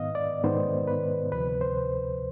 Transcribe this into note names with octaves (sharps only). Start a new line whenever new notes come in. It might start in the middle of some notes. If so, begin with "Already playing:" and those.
Already playing: G#2 D#3 B3 D#5 F5
D5
G#2 D#3 B3 C5
B4
D2 C3 F3 B4
C5